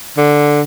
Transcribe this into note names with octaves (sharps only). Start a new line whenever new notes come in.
D3